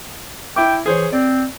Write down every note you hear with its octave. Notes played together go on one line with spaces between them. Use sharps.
E4 E5 G5 D6
E3 G#4 C5 C#5
C4 D5